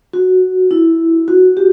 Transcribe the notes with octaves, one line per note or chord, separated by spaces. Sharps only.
F#4
E4
F#4
G4